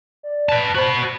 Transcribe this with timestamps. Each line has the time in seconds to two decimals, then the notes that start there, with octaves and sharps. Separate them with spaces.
0.23 D5
0.49 B4 A5
0.75 F#4 C5 B5